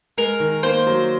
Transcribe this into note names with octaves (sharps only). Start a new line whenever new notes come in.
G#3 A#4
D#3
A#3 C5
F#3